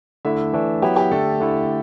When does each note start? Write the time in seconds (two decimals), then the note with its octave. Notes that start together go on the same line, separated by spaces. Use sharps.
0.25 D3 A3 E4 E5
0.53 E3 A3 D4
0.82 F#3 B3 E4 G4
0.96 G4
1.11 D3 A3 D4 A4
1.40 D3 A3 E4